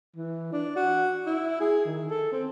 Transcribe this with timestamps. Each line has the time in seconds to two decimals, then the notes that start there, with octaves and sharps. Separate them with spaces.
0.16 E3
0.52 D4
0.76 F#4
1.26 E4
1.60 G#4
1.85 D#3
2.09 A4
2.32 C4